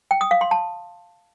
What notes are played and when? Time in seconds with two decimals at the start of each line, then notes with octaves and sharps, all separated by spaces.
0.11 G5
0.21 D#6
0.31 F5
0.41 C6
0.51 A5